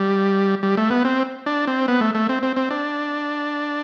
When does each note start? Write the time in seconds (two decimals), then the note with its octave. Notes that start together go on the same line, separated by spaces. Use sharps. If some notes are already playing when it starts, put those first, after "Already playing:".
Already playing: G3
0.63 G3
0.77 A3
0.90 B3
1.04 C4
1.46 D4
1.67 C4
1.88 B3
2.01 A3
2.15 A3
2.29 C4
2.43 C4
2.56 C4
2.71 D4